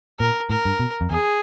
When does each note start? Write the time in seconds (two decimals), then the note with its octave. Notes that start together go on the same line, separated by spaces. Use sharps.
0.20 A#2 A#4
0.50 A2 A#4
0.65 G2
0.80 B2
1.01 F2
1.10 E2 G#4